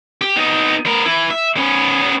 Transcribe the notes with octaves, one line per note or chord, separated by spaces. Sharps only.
G4
B3 D#4
B3 A#4
E3 E4
E5
B3 C#4